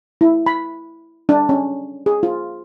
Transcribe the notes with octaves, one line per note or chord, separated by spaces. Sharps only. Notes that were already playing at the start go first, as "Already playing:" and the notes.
E4
B5
D4
C#4
G#4
F4